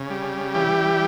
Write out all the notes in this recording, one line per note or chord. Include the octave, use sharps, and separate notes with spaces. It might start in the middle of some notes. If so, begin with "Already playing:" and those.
Already playing: C#3
G3
E3 G4